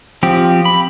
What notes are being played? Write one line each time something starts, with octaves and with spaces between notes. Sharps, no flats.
F3 C4 G4
B5